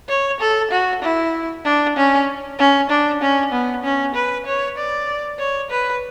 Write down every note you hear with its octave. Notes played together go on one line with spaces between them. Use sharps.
C#5
A4
F#4
E4
D4
C#4
C#4
D4
C#4
B3
C#4
B4
C#5
D5
C#5
B4